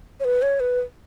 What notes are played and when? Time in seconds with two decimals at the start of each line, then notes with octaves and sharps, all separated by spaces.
0.20 C#5
0.25 B4
0.42 C#5
0.60 B4